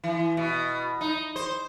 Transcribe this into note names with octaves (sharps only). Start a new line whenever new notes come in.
E3
B2
D#4
C5